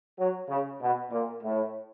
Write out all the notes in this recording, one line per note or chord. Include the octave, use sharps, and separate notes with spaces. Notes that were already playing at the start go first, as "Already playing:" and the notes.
F#3
C#3
B2
A#2
A2